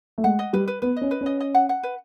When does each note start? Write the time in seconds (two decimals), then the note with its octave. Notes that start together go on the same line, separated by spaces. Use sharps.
0.18 A3
0.24 G#3 F#5
0.39 D#5
0.53 G3 B4
0.68 B4
0.82 B3 B4
0.97 C#4 D#5
1.11 B4
1.21 C#4
1.26 D#5
1.40 D#5
1.55 F#5
1.69 F#5
1.83 B4